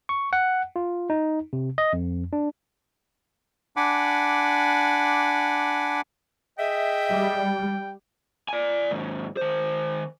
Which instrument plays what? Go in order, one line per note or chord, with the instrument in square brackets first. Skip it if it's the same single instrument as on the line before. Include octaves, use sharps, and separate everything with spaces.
[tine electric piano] C#6
F#5
F4
D#4
C3
D#5
F2
D4
[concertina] D4 F#5 G#5 B5 D6
[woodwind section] G#4 D#5 E5 [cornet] G5
[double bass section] G3
[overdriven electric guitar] D5 G#5
D#2 G#2
D#3 C5